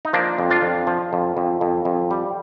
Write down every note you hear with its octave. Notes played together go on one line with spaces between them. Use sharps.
D#4
F3 A#3 D4
F2
D4 F4
F2
F3
F2
F2
F2
F2
G3